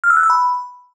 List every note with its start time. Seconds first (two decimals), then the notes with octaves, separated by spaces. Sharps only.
0.04 F6
0.10 E6
0.17 F#6
0.23 E6
0.30 B5